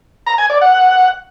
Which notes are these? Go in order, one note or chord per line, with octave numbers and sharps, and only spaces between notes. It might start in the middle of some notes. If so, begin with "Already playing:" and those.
A#5
G#5
D5
F#5